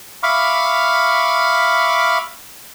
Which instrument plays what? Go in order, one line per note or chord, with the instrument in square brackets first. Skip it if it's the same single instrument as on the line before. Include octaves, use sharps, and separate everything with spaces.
[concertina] E5 F5 B5 C#6 D6 F6